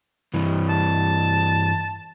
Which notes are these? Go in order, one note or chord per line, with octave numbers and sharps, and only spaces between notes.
G2 E3
A5